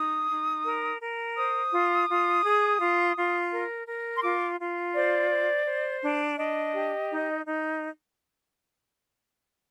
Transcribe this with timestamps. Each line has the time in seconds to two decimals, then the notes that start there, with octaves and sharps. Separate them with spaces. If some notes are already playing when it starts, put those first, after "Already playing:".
Already playing: D#4 D#6
0.30 D#4
0.64 A#4
1.01 A#4
1.37 C5 D#6
1.72 F4
2.08 F4
2.44 G#4
2.80 F4
3.16 F4
3.52 A#4
3.87 A#4
4.17 C6
4.23 F4 D6
4.59 F4
4.94 C5 D5
5.30 C5
5.66 C5
6.02 D4
6.38 D4 D#5
6.73 G4
7.10 D#4
7.45 D#4